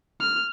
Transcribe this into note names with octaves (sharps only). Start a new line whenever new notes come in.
F6